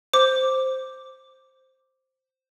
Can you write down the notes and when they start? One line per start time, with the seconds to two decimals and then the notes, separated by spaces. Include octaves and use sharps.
0.13 C5 D6